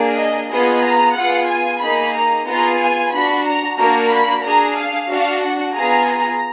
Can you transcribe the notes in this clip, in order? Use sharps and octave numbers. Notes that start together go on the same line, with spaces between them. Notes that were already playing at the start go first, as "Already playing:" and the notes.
Already playing: A#3 D4 G#4
D#5
B3 F4 G#4 D#5
A#5
B3 F4 G#4 F#5
G#5
A#3 D#4 G#4 B5
A#5
B3 F4 G#4 A#5
G#5
D4 F#4 B5
A#5
A#3 D4 F#4 A#5
B5
D4 G#4 A#5
F5
D4 F#4 F5
F#5
B3 F4 G#4 A#5
A#5